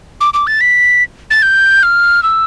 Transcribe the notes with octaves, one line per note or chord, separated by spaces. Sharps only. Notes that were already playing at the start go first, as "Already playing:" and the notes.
D6
D6
A6
B6
A6
G6
F6
E6